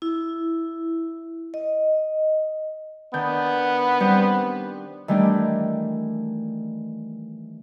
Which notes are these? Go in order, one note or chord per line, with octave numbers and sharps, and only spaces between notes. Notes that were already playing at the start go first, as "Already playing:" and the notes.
E4
D#5
D#3 B3 D4 G6
G3 C4 C5
D#3 E3 G3 A3 D4